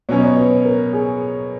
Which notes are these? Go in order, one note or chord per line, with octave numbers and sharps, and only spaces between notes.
B2 F#3 C#4 C#5
D#5
C#5
B4
A#4
G#4